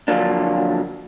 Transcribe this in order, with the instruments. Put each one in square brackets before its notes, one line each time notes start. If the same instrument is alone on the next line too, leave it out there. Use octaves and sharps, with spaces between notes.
[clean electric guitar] D3 F3 F#3 A#3 D4